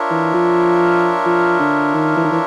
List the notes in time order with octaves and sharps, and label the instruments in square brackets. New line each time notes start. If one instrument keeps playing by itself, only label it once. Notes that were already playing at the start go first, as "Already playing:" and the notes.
Already playing: [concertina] D4 F4 A#4 C#5 E5
[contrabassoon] E3
F3
F3
D3
D#3
E3
D#3
E3